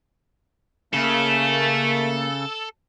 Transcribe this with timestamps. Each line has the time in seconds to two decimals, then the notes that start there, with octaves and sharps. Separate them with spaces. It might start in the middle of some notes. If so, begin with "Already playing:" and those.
0.94 C#3 A3 A#3 A4